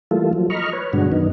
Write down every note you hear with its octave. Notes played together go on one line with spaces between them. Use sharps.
E3 G3 A3 A#3 F4 A4
F3 F#3
D#5 A#5 B5 C#6 F6
B4 C#5
G2 B2 D3 G#3 D4 F#4
F#2 D#3 B3 D#4